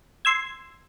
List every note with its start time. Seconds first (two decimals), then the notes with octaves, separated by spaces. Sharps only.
0.25 C6 E6 G#6